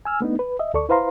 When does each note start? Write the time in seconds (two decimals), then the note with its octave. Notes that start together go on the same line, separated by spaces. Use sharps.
0.05 G#5 E6 F6
0.21 A3 B3 D4 D#4
0.39 B4
0.59 D#5 E5
0.74 D2 A4 D5 C#6
0.89 E4 B4 C5 F5 A#5 C6